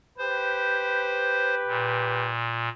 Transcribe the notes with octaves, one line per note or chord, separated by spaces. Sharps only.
G4 B4 C5
A#2